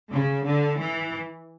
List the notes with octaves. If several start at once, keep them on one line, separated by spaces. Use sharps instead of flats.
C#3
D3
E3